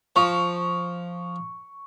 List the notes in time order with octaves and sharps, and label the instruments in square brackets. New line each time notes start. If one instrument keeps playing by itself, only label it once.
[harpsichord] F3 [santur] C#6